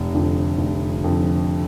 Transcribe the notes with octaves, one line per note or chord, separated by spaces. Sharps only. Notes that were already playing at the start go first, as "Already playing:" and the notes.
Already playing: F1
F2 D3
F1
F2 D3